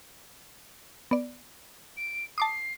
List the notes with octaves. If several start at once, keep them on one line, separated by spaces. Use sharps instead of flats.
B3 D5
D7
A5 D6 D#6 C7